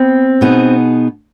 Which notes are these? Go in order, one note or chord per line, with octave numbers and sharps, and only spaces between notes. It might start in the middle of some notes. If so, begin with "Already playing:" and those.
Already playing: B3 C4
B2 B3 D#4 G#4